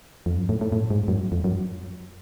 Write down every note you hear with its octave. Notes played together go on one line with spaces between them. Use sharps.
F2
F#2
A2
A2
A2
G#2
F#2
F2
F#2